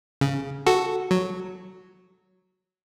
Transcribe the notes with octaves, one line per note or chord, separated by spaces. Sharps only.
C#3
F#4 A4
F#3